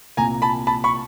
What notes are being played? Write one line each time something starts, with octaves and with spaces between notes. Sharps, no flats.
C2 A#2 G#5 A#5
A5 B5
A5 B5
B5 C#6